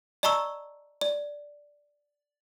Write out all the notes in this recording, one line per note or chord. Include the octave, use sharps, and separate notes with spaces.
D5 D#5 A5 A#5 C#6 E6
D5